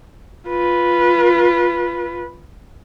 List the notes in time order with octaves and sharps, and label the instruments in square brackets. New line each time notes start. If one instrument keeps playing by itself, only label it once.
[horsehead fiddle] F4 B4